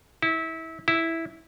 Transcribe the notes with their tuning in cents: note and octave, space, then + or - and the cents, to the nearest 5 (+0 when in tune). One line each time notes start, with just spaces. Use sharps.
E4 -25
E4 -5